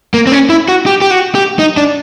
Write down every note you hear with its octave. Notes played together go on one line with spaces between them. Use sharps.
A#3
C4
C#4
E4
F#4
G4
G4
F#4
G4
D#4
D4